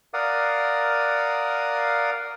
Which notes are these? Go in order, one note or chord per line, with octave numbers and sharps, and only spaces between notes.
A#4 D5 F5 F#5 D#6